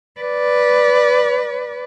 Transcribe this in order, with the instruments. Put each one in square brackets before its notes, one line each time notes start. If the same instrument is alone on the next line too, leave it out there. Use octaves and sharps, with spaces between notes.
[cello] B4 D5